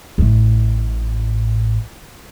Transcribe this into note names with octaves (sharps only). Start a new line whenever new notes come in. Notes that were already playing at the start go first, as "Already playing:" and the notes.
A1 A2